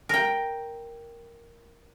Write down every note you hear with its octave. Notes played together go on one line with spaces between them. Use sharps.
A#4 G5